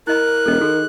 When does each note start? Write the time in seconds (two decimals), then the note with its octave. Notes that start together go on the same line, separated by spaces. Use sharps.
0.07 E4 A#4 D#5 B5 F#6
0.46 E1 A4 D#5
0.61 D#3 F#4 G#4 A4